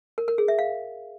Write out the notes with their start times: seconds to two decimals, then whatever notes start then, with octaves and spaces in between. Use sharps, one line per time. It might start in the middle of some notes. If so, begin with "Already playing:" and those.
0.18 A#4
0.28 A#4
0.38 G#4
0.48 E5
0.59 F5